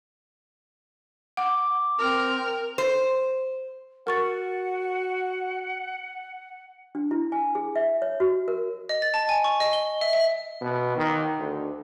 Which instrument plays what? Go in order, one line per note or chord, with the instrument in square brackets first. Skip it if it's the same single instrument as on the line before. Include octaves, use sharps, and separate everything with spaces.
[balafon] F#5 [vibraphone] D6
[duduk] C4 [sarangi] A#4
[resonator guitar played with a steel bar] C5
[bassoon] F#4 [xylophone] A#4 C#6 A6 [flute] F#5
[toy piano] D4
E4
G#5
G#4
E5
C#5
F#4
A#4
[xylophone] D#5
A6
A5
G#5
C#6
D#5
G7
E5
E5
[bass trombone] B2
D#3
D2